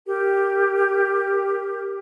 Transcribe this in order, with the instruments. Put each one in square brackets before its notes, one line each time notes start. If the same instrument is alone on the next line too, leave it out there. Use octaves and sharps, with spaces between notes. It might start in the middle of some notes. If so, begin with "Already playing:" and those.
[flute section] G4 A#4